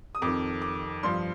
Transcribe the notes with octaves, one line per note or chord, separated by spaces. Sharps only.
D#6
F2 D#3 D6
D6
G2 F3 C6